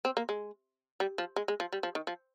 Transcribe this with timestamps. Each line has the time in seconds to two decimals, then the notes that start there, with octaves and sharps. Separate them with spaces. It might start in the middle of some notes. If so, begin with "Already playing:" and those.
0.05 C4
0.17 A#3
0.29 G#3
1.00 G3
1.18 F3
1.36 G#3
1.48 G#3
1.60 F3
1.73 G3
1.83 F3
1.95 D#3
2.07 F3